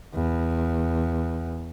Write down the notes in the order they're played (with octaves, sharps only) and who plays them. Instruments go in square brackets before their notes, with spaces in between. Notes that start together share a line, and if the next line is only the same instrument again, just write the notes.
[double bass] E2